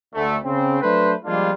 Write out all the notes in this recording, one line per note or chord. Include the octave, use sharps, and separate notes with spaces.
D2 A3
C#3 C4
F#3 A3 D4 B4 C5
F3 G3 G#3 A#3 D4 F4